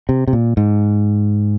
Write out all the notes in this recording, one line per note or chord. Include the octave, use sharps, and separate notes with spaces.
C3
C3
A#2
G#2